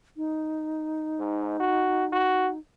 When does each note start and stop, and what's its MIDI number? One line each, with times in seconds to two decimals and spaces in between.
0.17 2.58 63
1.19 1.57 44
1.60 2.05 66
2.13 2.50 66